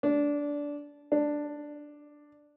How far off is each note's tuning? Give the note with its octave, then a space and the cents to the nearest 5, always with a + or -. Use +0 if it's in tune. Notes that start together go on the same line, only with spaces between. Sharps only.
D4 -15
D4 +5